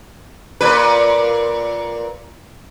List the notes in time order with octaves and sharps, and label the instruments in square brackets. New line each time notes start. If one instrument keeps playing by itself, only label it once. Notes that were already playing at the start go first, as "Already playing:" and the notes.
[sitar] A#2 B4